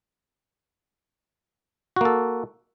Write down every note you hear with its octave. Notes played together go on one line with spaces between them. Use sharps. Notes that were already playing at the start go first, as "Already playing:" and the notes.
A#3 F#4 A4